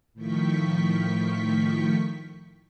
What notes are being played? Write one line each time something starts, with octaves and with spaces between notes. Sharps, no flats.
A2 D#3 F3 G5 C#6 B6